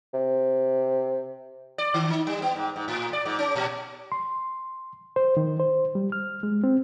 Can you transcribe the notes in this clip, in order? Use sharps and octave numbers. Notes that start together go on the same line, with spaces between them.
C3
D5
D#3
D#4
G3
B3
G#2
G#2
A2
D5
G#2
C#4
A#2
C6
C5
D#3
C5
G3
F6
G#3
C4